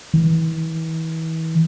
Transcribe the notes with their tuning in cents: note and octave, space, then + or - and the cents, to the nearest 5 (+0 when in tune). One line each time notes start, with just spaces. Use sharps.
E3 -35